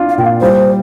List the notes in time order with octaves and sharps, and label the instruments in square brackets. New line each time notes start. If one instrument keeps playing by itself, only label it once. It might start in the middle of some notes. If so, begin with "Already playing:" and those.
Already playing: [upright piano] D4 F4
[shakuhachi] F5
[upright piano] A#2 [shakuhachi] G5
[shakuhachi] F5
[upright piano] G3 [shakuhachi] C5